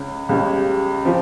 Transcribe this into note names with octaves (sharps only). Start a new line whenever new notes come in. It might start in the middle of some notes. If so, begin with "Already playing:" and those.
Already playing: C#2 C#4
C#2 C#3 G3 C#4
F3 C4 G4